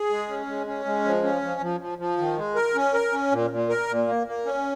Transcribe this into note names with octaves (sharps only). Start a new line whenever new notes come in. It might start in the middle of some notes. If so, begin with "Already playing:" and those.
Already playing: G#4
G#3
C#4
G#3
C#4
G#3
F3
C#4
F3
F3
F3
F3
D#3
G#3
A#4
C#4
A#4
C#4
A#2
A#2
A#4
A#2
A#3
A#3
C#4